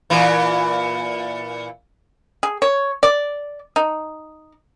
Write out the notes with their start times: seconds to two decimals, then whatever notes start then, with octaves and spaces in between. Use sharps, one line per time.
0.10 A#2 E3
2.43 G#4
2.62 C#5
3.03 D5
3.76 D#4